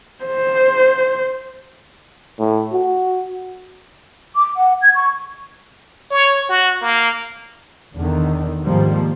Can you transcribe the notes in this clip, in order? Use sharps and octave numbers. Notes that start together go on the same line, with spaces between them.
C5
A2
F#4
D6
F#5
G#6
C#6
C#5
F#4
A#3
E2 D3 D#3
G#2 D#3 F3 G3 A#3